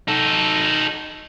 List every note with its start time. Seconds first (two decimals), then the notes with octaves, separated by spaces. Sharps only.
0.08 D#4 A4